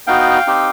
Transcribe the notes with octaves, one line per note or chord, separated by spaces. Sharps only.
B3 D#4 F#4 F5 G5
C4 D#4 G4